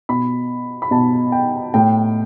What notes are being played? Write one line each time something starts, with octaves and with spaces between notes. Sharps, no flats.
B2 B5
B5
B2 A5
G5
A2 G5